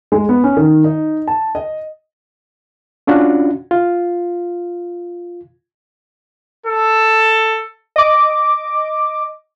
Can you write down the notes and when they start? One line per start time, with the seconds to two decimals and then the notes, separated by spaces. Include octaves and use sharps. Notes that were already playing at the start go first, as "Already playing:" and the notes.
0.12 G#3
0.29 B3
0.44 C#4
0.57 D#3
0.84 D#4
1.27 A5
1.55 D#5
3.07 C#4 D4 F4 F#4
3.71 F4
6.66 A4
7.96 D#5 D6